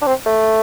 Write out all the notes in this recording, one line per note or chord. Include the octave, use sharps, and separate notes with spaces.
D4
C4
A3